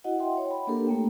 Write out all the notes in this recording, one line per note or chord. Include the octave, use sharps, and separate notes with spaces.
E4 F#4 D#5 F#5
D#5 E5 F#5 G5 C6
C#5
B5
A#3 D4 G4 A4 A#4
A3 A#3 C4 G5